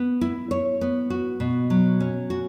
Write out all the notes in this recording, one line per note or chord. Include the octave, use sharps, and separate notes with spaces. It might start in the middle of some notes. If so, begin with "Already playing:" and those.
Already playing: B3
E4
C#5
B3
F#4
B2
F#3
C#4
F#4